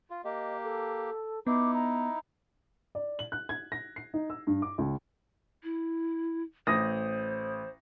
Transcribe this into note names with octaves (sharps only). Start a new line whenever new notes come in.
F4
A#3 G4 D#5
A4
B3 D#4 E4 D6
A#5
D5
F#7
F#6
G#6
A#6
C7
D#4
E6
G2
D6
C#2
E4
A1 C5 D#6 A#6